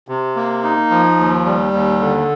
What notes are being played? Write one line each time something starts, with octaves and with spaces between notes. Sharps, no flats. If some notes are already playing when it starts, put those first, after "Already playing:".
C3
A#3
D#4
F3
D#2
G3
D#2
D3